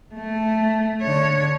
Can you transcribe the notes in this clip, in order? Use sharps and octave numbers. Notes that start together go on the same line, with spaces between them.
A3
D3 C#5